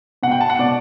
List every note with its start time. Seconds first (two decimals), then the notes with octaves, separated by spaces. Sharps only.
0.23 B2 F#5
0.31 G5
0.41 A5
0.50 F#5
0.59 B2 D5